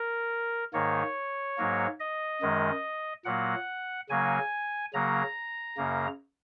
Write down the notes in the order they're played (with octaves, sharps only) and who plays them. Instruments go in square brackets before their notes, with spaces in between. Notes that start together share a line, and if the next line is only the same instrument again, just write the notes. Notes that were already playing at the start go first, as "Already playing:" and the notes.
Already playing: [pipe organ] A#4
G#2 D#3 A#3 C#5
G#2 F#3 A#3
D#5
F#2 D#3 G#3
A#2 F#3 A#3 F#5
C#3 F#3 A#3 G#5
C#3 F#3 A#3 A#5
F#2 C#3 A#3